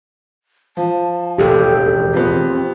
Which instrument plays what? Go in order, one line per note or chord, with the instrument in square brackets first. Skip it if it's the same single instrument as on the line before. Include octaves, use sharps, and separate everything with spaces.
[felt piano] F3 [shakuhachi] A5
[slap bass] E1 A1 D#2 [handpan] G4 [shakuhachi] A4
[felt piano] F2 B3 [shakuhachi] C4